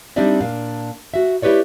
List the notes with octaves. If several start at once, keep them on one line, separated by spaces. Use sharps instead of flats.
G3 C4 D4 D#4 D5 E5
A#2 D4 F5
F#4 E5
E4 G4 B4 C#5 D5